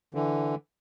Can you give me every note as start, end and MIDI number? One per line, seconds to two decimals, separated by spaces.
0.14 0.55 50
0.14 0.55 52